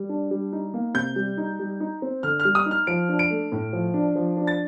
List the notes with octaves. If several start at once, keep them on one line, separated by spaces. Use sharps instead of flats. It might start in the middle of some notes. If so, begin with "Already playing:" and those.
Already playing: G3
D4
G3
D#4
A#3
C3 G6
G3
D#4
G3
D#4
C4
D3 F6
F6
G3
D#6
D#4
F6
F3 D7
D4
D7
A3
A2
F3
D4
F3
D4
A6